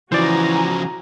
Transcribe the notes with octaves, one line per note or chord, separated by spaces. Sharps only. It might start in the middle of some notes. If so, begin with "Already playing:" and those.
C#3 E3 F3 F#4 C5 D5 G#5 A#5